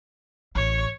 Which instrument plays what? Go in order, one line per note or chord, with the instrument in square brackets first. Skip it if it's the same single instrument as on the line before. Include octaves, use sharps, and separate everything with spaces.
[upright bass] A1 [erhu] C#5